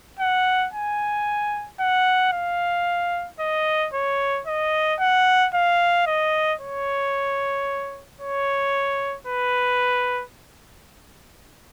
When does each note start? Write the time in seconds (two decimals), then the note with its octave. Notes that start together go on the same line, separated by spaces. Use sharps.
0.19 F#5
0.73 G#5
1.80 F#5
2.33 F5
3.40 D#5
3.93 C#5
4.47 D#5
5.00 F#5
5.54 F5
6.06 D#5
6.60 C#5
8.20 C#5
9.27 B4